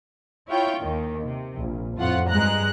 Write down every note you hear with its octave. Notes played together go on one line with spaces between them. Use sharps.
E4 F4 C#5 G5
D#2 D#3
C3
A#1
F2 A2 F4 F#5
G2 G#3 A#5 F#6